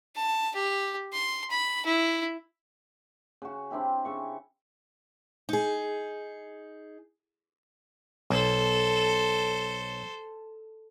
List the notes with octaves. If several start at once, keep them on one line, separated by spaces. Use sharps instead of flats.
A5
G4
C6
B5
E4
C#3 F#4
C4 D4 E4 G4
C#3 C#6
D#4 G#4
B1 A4 C5